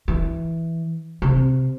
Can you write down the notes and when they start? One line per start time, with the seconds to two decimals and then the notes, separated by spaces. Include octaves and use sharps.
0.08 E3
1.22 C3